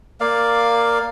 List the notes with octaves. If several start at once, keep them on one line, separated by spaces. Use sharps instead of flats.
A#3 D5 F5